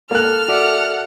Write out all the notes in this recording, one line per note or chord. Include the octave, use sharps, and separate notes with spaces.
A#3 A4 F6 F#6
F#4 A4 D5 E5 F#5